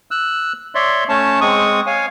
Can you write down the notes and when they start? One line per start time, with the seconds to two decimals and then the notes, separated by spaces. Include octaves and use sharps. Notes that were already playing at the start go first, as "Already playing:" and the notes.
0.11 E6 F#6
0.75 C#5 D5 E5 C6
1.09 A3 C#4 C#5 A5
1.41 G#3 C4 C#6 D#6
1.86 C#5 F5 G#5